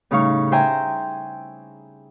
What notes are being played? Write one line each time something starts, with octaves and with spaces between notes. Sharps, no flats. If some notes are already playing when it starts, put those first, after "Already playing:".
A2 C#3 G3 D#4 F5 C#6
C5 E5 G5 G#5 A#5